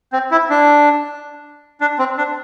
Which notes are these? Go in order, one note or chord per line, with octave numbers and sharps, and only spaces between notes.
C4
E4
D4
D4
C4
D4